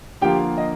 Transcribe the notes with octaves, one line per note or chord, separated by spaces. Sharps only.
D3 F3 A#3 F4 G4 G5
D#5